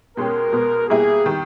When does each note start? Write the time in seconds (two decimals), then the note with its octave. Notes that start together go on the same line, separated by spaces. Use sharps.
0.17 B2 G#3 C#4 G4 A#4
0.53 B2 G#3 B3
0.89 B2 G3 A#3 E4 G#4
1.26 D#3 G3